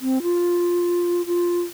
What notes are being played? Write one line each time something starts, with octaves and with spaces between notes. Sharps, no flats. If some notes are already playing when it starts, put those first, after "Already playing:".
C4
F4
F4